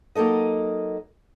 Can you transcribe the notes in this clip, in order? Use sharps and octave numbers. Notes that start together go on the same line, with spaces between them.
F#3 A#3 D#4 A4 D#5